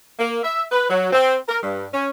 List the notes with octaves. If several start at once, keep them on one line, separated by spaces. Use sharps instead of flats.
A#3
E5
B4
F#3
C4
A#4
G2
C#4